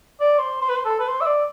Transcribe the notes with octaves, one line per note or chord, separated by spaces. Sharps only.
D5
C5
C5
B4
C5
A4
B4
C5
E5
D5